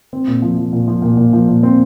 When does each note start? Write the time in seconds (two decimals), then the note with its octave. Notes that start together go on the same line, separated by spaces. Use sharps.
0.13 C4
0.28 A#2
0.42 F3
0.57 F3
0.73 A#2
0.88 F3
1.02 A#2
1.17 A#2
1.33 F3
1.48 A#2
1.63 C4